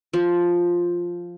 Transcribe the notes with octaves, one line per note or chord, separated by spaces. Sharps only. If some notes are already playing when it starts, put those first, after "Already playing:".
F3